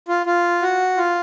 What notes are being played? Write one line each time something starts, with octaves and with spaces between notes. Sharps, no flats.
F4
F4
F#4
F4